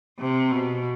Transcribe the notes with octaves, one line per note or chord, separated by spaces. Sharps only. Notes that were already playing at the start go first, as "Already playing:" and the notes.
C3
B2